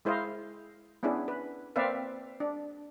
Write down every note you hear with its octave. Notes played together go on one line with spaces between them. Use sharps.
G#3 E4 C5 D#5 F5
B3 C#4 D4 E4 G#4
B4
A#3 C4 B4 D5 E5 F5
D4